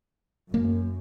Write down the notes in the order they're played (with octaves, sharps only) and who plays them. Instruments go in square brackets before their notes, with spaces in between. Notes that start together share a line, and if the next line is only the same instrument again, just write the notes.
[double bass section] F#2 [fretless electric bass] A#3